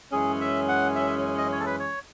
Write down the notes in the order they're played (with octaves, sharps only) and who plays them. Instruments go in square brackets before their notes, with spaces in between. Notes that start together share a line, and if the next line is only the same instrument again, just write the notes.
[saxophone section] F#2 E3 G#3 C#4 [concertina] G#4
[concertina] E5
F#5
E5
D#5
C#5
A4
B4
C#5